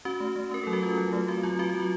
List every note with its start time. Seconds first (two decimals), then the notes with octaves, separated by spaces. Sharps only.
0.05 C#4 F#4
0.20 A3
0.36 A3
0.51 C#4 A#4
0.63 F#3 A4
0.73 F#4
0.82 C#4 F4
0.98 F#3
1.13 A3
1.28 C4 F#4
1.43 F#3 F4
1.59 C4 F#4
1.69 F#4
1.75 F#3
1.80 F4